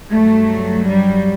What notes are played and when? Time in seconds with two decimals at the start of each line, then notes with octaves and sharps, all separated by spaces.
0.11 G2 F#3 A3
0.89 G3